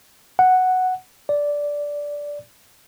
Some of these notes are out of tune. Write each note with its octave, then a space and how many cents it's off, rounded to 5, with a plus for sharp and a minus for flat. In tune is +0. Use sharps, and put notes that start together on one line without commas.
F#5 +0
D5 -10